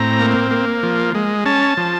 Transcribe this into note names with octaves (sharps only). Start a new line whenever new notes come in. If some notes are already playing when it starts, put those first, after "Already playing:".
Already playing: A2 C4 A#5
A#3
A#3
F3
G#3
C#4 A5
F3